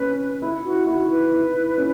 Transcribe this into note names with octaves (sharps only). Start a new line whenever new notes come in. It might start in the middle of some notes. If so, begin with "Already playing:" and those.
Already playing: C#4 B4
E4
F#4
E4 F#4
B4
E4
C#4